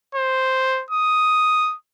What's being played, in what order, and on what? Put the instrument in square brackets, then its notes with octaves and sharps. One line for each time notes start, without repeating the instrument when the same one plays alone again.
[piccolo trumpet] C5
D#6